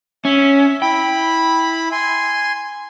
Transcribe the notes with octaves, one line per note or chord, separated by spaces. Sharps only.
C#4 E5
E4 G5 B5
G#5 C6